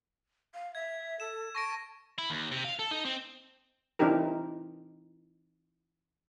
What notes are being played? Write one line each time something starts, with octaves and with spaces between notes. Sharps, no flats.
F5
E5 G#6
A4 E7
A5 C#6 A#6 D7
E4
D#2
C3
F5
A4
D#4
C4
E3 C4 D4 D#4 G4 A#4